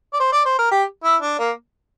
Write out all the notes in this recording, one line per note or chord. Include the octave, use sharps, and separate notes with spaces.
D5
C5
D5
C5
A#4
G4
E4
D4
A#3